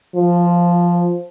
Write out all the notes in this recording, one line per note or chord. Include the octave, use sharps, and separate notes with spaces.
F3